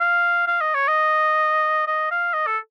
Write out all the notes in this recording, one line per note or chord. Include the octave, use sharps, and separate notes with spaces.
F5
F5
D#5
C#5
D#5
D#5
F5
D#5
A4